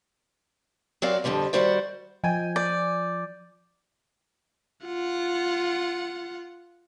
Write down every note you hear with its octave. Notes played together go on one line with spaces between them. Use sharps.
F#3 C4 F#4 A#4 D5 F5
F2 B2 D3 F3 G3
D#3 F#3 G3 F#4 C5 D5
F3 D#5 G5 G#5
D5 G6
F4 F#5